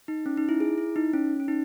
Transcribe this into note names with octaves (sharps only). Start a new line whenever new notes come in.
D#4
C#4
D#4
E4
G#4
E4
D#4
C#4
C#4
D#4